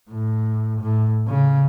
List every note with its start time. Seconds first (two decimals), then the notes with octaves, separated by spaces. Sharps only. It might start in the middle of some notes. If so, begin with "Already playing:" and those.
0.10 A2
0.80 A2
1.27 C#3